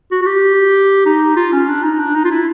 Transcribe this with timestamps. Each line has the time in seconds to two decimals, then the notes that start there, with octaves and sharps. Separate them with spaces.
0.11 F#4
0.22 F#4
0.26 G4
1.06 D#4
1.36 F4
1.52 C#4
1.69 D4
1.83 D#4
2.00 D4
2.15 D#4
2.25 F4
2.31 E4